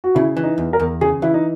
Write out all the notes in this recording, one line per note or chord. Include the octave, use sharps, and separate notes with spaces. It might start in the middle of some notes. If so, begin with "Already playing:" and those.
F#4
C#3 E4
E3
D#4
E2
A#4
E2
C#3 G#4
E3 E4
D#4